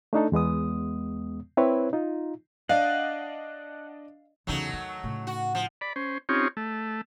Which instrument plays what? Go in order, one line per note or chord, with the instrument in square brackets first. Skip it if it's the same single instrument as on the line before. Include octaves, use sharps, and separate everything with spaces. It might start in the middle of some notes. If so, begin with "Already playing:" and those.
[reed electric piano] A3 D4 D#4 A4
E2 G#3 B3 D#6
C4 E4 B4 C#5
D#4 F4
[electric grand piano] D4 D5 D#5 [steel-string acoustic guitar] F5 [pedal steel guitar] F#5
[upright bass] E2 C#3 [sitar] F#3 A3 D#4
[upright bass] D#3
A2 C#3
[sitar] F#4
F3
[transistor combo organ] D5 B5
C#4 C5
C4 C#4 D#4 F4 G4 C#5
A3